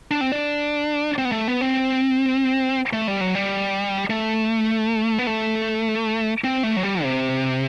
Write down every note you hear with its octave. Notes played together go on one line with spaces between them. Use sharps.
D4
C4
D4
C4
B3
A3
B3
C4
A3
G3
F#3
G3
A3
B3
A3
C4
A3
F#3
G3
C3